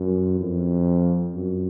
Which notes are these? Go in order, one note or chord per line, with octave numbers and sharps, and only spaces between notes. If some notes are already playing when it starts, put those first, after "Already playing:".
Already playing: F#2
F2
F#2